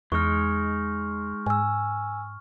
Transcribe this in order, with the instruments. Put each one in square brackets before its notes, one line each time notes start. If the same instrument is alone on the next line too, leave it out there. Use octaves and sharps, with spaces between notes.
[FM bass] E2 [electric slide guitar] G#3 D#4 [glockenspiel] C#6 F6
[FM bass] G#2 [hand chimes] G#5 E6